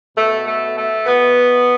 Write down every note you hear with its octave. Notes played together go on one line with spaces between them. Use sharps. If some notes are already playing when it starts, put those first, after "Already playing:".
B2 A3
A3
A3
B2 B3